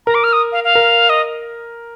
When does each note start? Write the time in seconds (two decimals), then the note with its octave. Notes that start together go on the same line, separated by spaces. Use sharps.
0.06 A#4 A#5
0.15 D6
0.24 F6
0.33 D#6
0.52 F5
0.64 F5
0.75 A#4
1.09 D#5